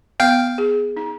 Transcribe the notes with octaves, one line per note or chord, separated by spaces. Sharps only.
B3 F5 G5
G#4
D#4